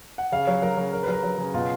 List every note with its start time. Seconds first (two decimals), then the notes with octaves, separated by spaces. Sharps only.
0.18 F#5
0.32 C#3 F5
0.47 F#3 C#5
0.62 F#3 A#4
0.77 C#3 A#4
0.93 C#3 A#4
1.03 F#3 B4
1.13 A#4
1.23 F#3
1.38 C#3
1.54 B2 F4